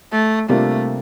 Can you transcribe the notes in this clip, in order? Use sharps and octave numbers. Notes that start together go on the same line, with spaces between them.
A3
C3 G3 A3 A#3 D4 F4